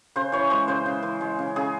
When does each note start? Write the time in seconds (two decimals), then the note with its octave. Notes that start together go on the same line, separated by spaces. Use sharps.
0.16 C#3 C5
0.32 E3 C#5
0.50 G#3 C5
0.68 C#3 C5
0.86 C#3
1.03 E3
1.21 G#3
1.39 C#3
1.56 C#3 G#4